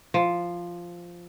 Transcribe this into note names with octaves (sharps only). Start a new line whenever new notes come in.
F3